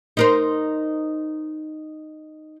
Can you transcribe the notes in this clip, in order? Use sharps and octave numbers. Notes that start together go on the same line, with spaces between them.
D#4 A#4 C5